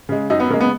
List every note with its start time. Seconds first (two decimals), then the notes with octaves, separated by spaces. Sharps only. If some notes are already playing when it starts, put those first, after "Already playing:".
0.09 C#3 G#3
0.30 F#2 D#4
0.40 B3
0.50 C#3 A#3
0.54 G#3
0.61 B3